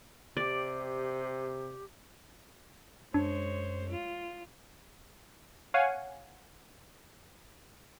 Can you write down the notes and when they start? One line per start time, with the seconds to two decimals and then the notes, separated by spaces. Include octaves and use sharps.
0.37 C3 G4 D5
3.14 F#2 G#3 D4 C5 C#5
3.90 F4
5.74 C#5 F5 F#5 G#5